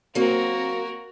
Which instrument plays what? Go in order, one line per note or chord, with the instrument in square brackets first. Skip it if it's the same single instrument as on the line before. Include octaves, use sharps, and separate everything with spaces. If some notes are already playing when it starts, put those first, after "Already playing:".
[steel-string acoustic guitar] F#3 A#3 [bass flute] C4 [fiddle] F#4 A#4